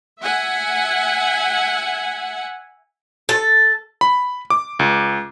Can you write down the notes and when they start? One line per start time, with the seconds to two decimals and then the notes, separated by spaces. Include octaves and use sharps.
0.20 E5 F#5 G#5
3.29 A4
4.01 B5
4.50 D6
4.79 C#2